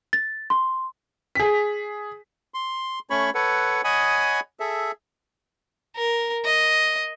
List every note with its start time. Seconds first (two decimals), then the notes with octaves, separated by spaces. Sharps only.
0.13 A6
0.50 C6
1.35 G#4 B6
2.54 C6
3.10 A3 C#4 C#5 B5 C#6
3.35 A4 B4 C#5 F#5
3.84 C#5 D#5 F#5 G#5 B5 D#6
4.60 G#4 A4 E5
5.96 A#4
6.45 D#5